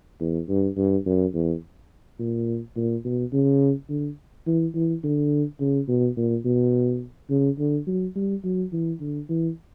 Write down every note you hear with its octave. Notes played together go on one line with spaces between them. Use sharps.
E2
G2
G2
F#2
E2
A#2
A#2
B2
C#3
D3
E3
E3
D3
C#3
B2
A#2
B2
C#3
D3
F#3
G3
F#3
E3
D3
E3